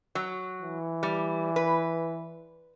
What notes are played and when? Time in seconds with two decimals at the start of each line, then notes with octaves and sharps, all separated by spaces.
0.15 F#3
0.62 E3
1.03 G3
1.56 B4